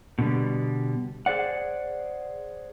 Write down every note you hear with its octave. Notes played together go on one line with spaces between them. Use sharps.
B2 D3 G3
G#4 C5 D5 F#5